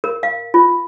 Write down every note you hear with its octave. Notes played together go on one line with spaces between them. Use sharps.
A#4
F5
F4